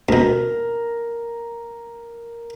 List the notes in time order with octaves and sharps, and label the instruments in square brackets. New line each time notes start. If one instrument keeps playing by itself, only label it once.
[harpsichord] D2 B2 [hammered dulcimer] A#4